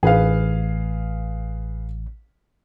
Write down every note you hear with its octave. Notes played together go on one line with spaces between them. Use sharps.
A1 G#4 B4 F5